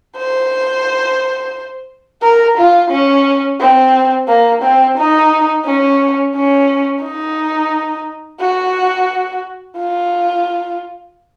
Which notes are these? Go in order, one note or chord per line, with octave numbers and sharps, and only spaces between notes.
C5
A#4
F4
C#4
C4
A#3
C4
D#4
C#4
C#4
D#4
F#4
F4